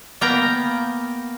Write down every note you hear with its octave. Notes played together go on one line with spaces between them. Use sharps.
A#3 B3 F5 G5 A#5